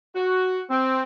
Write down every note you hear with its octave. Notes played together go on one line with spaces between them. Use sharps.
F#4
C4